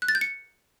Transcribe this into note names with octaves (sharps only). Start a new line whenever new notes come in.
F#6
A6
G6
C#7